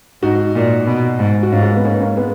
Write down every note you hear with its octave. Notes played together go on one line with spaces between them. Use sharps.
G#2 D#4 F#4
A#2
B2
G#2
F#4
G#2 C#4 F4
G#3
A#3
B3
G#2 A#3 C#4
A#3 C#4
G#3 B3